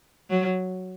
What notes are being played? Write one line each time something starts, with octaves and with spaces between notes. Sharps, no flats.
F#3